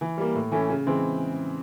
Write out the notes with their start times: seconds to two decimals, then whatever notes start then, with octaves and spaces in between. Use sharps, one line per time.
0.01 E3
0.17 G3 A#3
0.35 A2
0.52 E3 A3 C#4
0.70 C#3
0.87 E3 G#3 C4